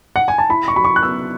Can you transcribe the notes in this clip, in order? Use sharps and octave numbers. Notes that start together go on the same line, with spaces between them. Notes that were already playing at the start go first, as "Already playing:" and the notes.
F#5
G#5
A5
E4 B5
C#6
F#3 B5
C#6
F#6
B3 E6